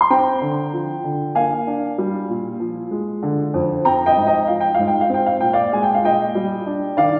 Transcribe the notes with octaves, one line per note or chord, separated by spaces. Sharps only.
C6
C4 G5 A#5
D3
F3
D3
A#3 F5 G#5
D4
G3
A#2
F3
G#3
D3
F2
C4 G5 A#5
D#5 G5
G#2
D#5 G5
F3 F5
G5
G#2 F5
G5
F5
C4 G5
F5
A#2 G5
D5 F5
G#3 G#5
G5
F5
A#2 D#5 G5
G3
D4
D#3 D5 F5